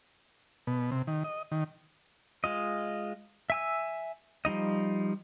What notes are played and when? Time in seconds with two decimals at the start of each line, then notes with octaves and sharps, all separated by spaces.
0.67 B2
0.91 C3
1.07 D#3
1.24 D#5
1.52 D#3
2.44 G#3 F4 D#5
3.50 E5 G#5 E6
4.45 F3 G3 D#4 D#5